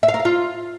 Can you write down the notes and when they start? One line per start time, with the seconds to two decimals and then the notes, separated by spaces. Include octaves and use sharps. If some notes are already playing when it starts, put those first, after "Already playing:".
0.03 E5
0.08 F5
0.14 A#4
0.20 F5
0.25 F4